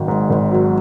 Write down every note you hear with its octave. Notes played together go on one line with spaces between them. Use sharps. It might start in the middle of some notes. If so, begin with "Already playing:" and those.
Already playing: G#1 D#3 F#3
G#2
G#1
F#3